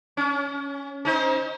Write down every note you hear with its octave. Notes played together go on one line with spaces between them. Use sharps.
C#4
C#4 D#4 C5